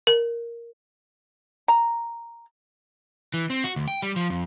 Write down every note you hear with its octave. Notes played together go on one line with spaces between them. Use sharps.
A#4
A#5
E3
C4
F#4
D2
G5
G3
F3
F2